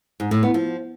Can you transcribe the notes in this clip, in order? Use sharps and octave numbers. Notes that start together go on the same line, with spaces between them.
G#2
A2
B3
F3